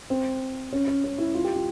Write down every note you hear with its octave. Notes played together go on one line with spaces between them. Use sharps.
C4
C#4
C#4
C#4
E4
F4
G4
F4